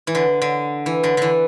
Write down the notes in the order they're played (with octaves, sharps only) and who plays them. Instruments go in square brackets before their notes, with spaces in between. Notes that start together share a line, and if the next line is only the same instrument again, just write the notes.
[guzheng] E3
D3
D3
E3
D3
D3 E3